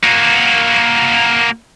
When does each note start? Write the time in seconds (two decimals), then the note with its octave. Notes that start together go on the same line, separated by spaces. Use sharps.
0.03 A#3 F#4